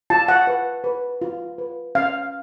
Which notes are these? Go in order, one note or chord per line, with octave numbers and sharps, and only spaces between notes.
F4 A5
F#5
B4
B4
F4
B4
C#4 F5